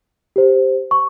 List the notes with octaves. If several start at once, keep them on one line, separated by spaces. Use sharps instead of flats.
G4 C5
C#6